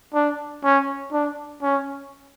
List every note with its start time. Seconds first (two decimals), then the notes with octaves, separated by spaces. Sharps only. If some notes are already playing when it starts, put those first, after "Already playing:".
0.14 D4
0.64 C#4
1.12 D4
1.62 C#4